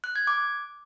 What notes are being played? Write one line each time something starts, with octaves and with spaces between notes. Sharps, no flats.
F#6
G#6
D6